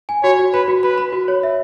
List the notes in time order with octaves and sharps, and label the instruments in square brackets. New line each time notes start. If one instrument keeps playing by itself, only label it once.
[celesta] G#5
[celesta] F#4 [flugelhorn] C#5
[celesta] F#4
[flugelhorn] B4 [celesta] B5
[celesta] F#4
[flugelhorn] B4 [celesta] B5
[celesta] B5
F#4
C#5
E5